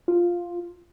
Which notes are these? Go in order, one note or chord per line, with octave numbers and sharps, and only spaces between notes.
F4